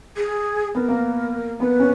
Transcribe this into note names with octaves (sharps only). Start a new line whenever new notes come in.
G#4
B3 A#4
A#3
B3 B4
C#4